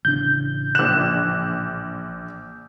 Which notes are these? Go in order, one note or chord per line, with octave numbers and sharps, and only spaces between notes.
A1 C#3 D4 G6
A#1 F#6 E7